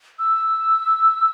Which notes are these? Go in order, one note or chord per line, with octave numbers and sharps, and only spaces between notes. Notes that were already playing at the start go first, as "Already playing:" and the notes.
E6